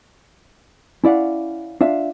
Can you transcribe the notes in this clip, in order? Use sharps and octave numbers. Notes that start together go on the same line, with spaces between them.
C#4 E4 D5 F5 F#5
D4 F4 E5 F5